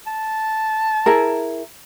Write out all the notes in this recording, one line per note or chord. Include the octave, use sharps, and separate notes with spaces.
A5
E4 G#4 A#4